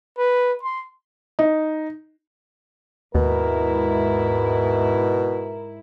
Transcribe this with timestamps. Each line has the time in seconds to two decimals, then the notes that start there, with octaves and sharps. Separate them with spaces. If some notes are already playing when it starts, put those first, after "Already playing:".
0.18 B4
0.63 C6
1.39 D#4
3.15 D#2 G#2 B2 E4 A#4